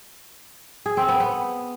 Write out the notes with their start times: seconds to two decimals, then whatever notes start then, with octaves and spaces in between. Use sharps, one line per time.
0.86 G#4
0.97 C4
1.08 B3
1.20 B3